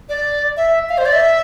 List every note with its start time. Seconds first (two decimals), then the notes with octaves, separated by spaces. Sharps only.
0.09 D5
0.57 E5
0.89 F5
0.98 C5
1.05 D5
1.13 E5